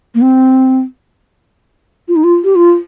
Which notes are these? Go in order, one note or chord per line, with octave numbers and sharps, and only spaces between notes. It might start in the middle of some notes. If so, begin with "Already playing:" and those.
A#3
C4
F4
D#4
F4
G4
F4